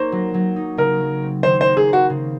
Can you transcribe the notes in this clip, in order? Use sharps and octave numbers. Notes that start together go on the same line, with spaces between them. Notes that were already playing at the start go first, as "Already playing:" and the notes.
Already playing: A#3 D#4 C5 C#5
F#3
F#3
D#4
C#3 A#4
F#3
C4
D#3 C5
C5
A#3
G#4
C5
F#4
C#3